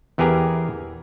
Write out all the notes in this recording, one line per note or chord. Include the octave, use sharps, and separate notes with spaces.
E2 E3 G4 G#4 A#4 G#5